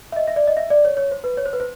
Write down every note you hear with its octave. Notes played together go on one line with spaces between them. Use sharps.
E5
D#5
E5
D5
D#5
E5
D5
C#5
C#5
C5
B4
C#5
C5
B4
C5